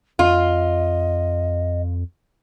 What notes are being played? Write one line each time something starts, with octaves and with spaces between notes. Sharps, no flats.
F2 F4 D#5